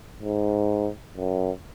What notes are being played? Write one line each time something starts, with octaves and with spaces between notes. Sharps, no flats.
G#2
F#2